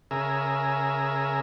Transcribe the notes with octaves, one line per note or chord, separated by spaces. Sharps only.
C#3 G#4 A#4 E5